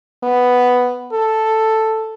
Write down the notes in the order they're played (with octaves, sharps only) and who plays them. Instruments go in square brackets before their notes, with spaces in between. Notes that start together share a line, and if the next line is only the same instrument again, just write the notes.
[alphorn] B3
A4